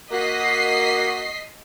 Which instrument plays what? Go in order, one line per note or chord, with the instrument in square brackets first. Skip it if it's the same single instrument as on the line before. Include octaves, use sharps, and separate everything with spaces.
[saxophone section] A#3 F#4 [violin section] D#5 B6 C7